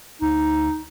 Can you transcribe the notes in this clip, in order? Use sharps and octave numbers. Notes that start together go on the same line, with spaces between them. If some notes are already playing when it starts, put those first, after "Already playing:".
D2 D#4